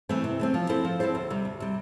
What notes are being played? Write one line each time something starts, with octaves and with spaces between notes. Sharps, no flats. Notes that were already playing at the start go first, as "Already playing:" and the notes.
E3 A3 C4
C3
E3 A3 C4
F3
C4 E4 A4 C5
F3
C4 E4 A4 C5
D2
C3 G3
D2
C3 G3